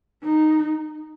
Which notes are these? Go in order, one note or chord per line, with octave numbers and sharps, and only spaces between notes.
D#4